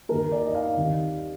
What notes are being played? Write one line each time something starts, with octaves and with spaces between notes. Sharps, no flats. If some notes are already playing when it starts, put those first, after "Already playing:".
D#2 D#3 A#3 A#4
D5
D#5
F5
D#2 D#3 G3 C4